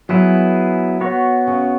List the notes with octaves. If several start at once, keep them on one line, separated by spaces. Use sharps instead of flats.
F#3 B3 E4 G#4 B4
B3 F#4 C#5
C#3